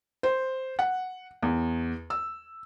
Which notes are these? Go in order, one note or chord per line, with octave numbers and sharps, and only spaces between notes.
C5
F#5
E2
E6